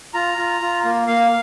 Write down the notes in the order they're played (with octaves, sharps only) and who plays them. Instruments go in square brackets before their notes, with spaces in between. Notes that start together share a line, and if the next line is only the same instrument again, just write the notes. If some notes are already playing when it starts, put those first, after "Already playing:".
[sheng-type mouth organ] F4 A#5
F4
F4
A#3
A#3 F5